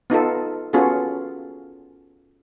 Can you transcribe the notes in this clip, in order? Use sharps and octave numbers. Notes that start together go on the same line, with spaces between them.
B3 D#4 F4 A4
B3 C#4 F4 F#4 G#4 A4